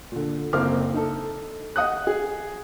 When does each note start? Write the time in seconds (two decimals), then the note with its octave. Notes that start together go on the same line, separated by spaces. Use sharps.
0.12 A#2 D3
0.53 F#1 A#3 C4 E4 D6 F6
0.94 D#4 A4
1.76 D#5 F#5 D#6 F#6
2.07 G#4